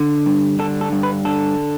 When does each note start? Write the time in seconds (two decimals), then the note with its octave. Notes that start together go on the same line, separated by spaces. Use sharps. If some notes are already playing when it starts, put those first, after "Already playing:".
Already playing: D3
0.26 G2
0.59 D3 A4
0.81 A4
0.92 G2
1.03 B4
1.25 D3 A4